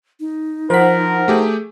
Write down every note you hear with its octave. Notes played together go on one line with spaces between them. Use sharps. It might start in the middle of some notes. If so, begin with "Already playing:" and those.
D#4
F3 A#4 C5 F#5 B6
A3 G4 G#4